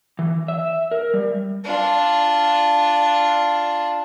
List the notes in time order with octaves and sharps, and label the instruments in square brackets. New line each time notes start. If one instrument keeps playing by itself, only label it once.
[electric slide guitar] E3
E5
A#4
G3
[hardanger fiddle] D4 F4